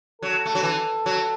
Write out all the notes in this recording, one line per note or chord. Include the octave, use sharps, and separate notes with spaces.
F#3 A4
A3
F#3
E3
F#3